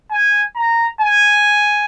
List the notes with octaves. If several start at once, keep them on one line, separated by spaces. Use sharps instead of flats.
G#5
A#5
G#5